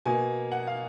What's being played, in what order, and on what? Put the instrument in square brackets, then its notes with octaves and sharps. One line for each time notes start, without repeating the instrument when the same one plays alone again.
[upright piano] B2 A#3 G#5
F#5
F5